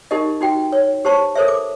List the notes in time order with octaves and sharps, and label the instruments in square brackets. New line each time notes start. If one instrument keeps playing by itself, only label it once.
[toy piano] D#4 G4 A#4 D#5
D#4 F#4 G5
C#5
G4 C5 C#5 A5 C#6
A4 A#4 C5 C#5 E5
D6